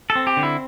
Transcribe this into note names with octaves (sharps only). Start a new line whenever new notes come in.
A4
C4
G4
D3
E4